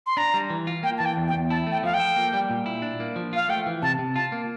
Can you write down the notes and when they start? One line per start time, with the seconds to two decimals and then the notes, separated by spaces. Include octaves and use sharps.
0.07 C6
0.17 D4 A#5
0.34 G3
0.50 E3
0.67 F4
0.83 A#3 G5
0.98 E3 A5
1.06 G5
1.17 E2
1.28 G5
1.34 E2
1.50 E4 A5
1.67 A3 G5
1.83 F3 F5
1.94 G5
2.00 A4
2.16 A#3
2.33 G3
2.50 A#2
2.66 E4
2.82 D4
3.00 A#3
3.16 F3
3.33 F4 F5
3.49 A3 G5
3.66 E3
3.82 C3 A5
3.99 C3
4.16 F4 A5
4.32 A#3